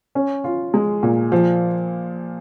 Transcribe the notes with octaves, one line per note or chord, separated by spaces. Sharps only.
C#4
F4
G#3
A#2
F3